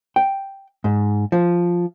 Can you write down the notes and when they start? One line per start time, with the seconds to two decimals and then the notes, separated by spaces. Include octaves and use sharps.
0.16 G5
0.84 G#2
1.32 F3